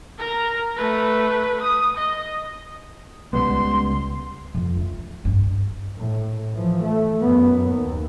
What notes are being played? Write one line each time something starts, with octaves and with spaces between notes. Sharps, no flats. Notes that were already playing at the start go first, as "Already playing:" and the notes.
A#4 A#5
A3 B4
D#6
D#5
C#2 G3 B3 C6
F2
A3
G2
A2
E3 F3
A3
F#2 B3
D#2